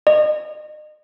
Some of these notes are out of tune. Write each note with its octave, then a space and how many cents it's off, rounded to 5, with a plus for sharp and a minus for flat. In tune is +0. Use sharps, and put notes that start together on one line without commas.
D#5 -35